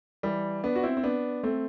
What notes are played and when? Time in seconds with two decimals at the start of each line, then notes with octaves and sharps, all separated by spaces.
0.23 E3 G3
0.64 B3 D4
0.76 F#4
0.83 C4 E4
0.97 C4
1.03 B3 D4
1.43 A3 C4